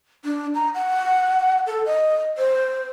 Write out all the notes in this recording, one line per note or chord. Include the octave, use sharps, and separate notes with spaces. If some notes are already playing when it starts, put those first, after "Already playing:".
D4
A#5
F#5
A4
D#5
C5